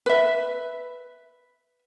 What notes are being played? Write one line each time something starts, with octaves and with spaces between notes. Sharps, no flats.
B4 E5